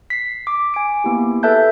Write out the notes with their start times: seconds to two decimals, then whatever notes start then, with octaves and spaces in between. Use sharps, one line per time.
0.10 B6 C7
0.47 D6
0.74 G#5 D7
1.04 A#3 B3 E4 G4
1.43 A4 B4 E5 A5 F#6 G6